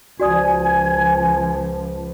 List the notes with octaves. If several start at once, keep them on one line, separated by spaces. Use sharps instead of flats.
C#2 F3 F#4 D5 G#5 D#6 G#6